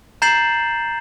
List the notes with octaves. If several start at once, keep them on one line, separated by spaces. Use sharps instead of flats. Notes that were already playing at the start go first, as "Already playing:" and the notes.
A#5 G6 A6 C7 E7 F#7